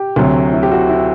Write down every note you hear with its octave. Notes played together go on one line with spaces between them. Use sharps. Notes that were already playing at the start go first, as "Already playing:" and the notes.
Already playing: G4
D2 C3 F#3
E4
G4
F#4
E4